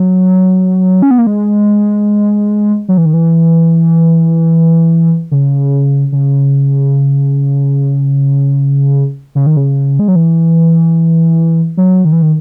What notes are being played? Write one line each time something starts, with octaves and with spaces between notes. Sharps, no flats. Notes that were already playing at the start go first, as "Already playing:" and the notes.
Already playing: F#3
C#4
B3
A#3
G#3
F#3
E3
D#3
E3
C#3
C#3
C#3
D#3
C#3
G#3
F#3
E3
F#3
D#3
E3
D#3